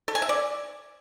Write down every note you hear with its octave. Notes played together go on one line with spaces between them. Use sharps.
A4
G#5
E5
D5